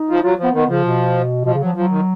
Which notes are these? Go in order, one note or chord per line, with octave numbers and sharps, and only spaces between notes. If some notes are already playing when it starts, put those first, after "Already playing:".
Already playing: D#4
F3
F#3 F4
F3 B3
D#3 B3
C#3 F3
B2
B2 F3
C#3
F3 F#3
F3 F#3
D#3